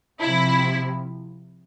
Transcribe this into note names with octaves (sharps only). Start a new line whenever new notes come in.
C3 F3 E4